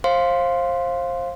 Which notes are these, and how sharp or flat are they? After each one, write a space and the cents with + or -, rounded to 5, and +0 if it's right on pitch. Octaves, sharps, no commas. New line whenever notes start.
C5 +30 F5 +0 C6 +0